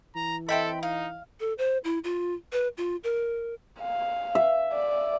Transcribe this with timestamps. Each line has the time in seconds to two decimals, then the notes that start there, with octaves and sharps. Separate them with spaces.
0.15 E3 A#5
0.49 C4 A4 D#5 E5 G5 B5
0.83 D#4 F5
1.40 A4
1.58 C5
1.84 E4
2.04 F4
2.52 B4
2.77 F4
3.04 A#4
3.81 F5
4.35 E5
4.73 D5